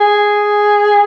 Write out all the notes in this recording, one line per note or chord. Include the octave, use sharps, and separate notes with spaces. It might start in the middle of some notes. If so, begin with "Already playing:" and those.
G#4